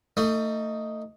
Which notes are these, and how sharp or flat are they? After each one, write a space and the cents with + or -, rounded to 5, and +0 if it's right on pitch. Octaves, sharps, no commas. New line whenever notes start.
A3 +30 D#4 +0